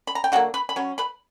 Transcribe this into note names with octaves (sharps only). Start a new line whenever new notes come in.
B5
A#5
G5
D3 F#3 A#3 F#4 F#5
B4 B5
B5
F#3 C#4
B4 B5